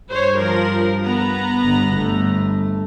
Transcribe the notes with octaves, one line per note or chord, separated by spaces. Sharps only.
G2 C5 C#5
F3 A#4
B3 A#5
G1
G1 A3